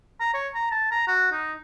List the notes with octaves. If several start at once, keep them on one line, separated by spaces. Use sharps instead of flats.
A#5
C#5
A#5
A5
A#5
F#4
D#4